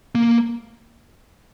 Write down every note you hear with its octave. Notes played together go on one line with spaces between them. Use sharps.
A#3